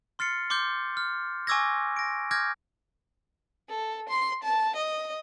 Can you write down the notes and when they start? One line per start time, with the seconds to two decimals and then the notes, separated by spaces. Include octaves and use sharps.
0.19 C6 F6 A6 C7 C#7
0.50 C6 D6 F6 G6
0.97 F6
1.47 G#5 C#6 D6 E6 G#6 A#6
1.97 A#6 D7
2.31 D6 F6 G6 G#6 A#6
3.69 A4
4.09 C6
4.43 A5
4.75 D#5